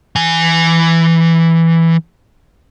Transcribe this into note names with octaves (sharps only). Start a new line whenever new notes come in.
E3 G#5